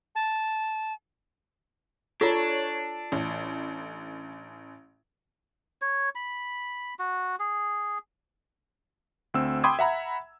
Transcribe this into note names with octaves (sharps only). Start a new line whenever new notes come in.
A5
D4 F4 A4 C#5 A#5
A1
C#5
B5
F#4
G#4
D2 C4 E6
G5 B5 C6 D6 D#6 G#6
E5 F#5 A#5 B5